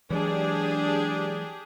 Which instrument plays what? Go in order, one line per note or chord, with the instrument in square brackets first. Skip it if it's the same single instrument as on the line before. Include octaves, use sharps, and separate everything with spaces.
[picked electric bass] E3 F#3 G#3 [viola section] D4 G4 G#4